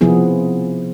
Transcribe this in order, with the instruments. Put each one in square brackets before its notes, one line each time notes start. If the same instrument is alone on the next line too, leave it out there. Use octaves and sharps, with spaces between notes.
[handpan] C3 F3 B3 E4 G#4